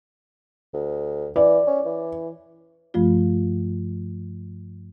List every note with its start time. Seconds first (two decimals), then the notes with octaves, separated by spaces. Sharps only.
0.74 D2
1.36 E3 D5
1.67 C#4
1.86 E3
2.94 G2 F3 A3 F4